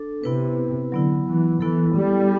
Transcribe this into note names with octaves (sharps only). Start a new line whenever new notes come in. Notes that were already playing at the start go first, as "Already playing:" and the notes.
Already playing: D4 A4
C3 B3 E4 B4
D3 F#3 B3 E4
E3
E3 B3 E4 A4
G3